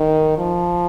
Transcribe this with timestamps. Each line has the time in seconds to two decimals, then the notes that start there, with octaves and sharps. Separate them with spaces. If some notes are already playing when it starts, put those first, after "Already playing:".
Already playing: D#3
0.38 F3